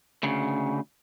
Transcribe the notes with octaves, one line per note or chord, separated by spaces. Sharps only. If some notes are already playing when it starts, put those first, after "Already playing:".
D2 C#3